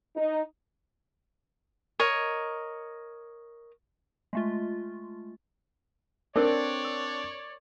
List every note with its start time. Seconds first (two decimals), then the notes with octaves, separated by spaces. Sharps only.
0.16 D#4
2.00 A#4 C#5 D#5
4.33 G#3 A3 F4
6.36 C4 D4 A4 A#4 C#5 D5 E6
6.85 E6